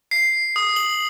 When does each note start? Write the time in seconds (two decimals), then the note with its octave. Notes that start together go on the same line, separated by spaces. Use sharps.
0.11 C7
0.56 D#6
0.76 F#7